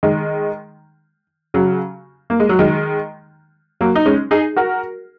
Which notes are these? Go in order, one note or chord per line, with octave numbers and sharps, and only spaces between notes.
D#3 G#3
C#3 F#3
A#3
G#3
F#3
D#3 G#3
F#3 A#3
D#4
G#3 C#4
D#4 G#4
F#4 A#4